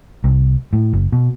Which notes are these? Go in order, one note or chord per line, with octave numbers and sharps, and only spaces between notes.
C2
A2
F#1
B2